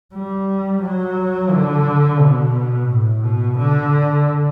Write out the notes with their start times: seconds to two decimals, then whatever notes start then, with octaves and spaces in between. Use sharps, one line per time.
0.14 G3
0.82 F#3
1.51 D3
2.20 B2
2.89 A2
3.24 B2
3.58 D3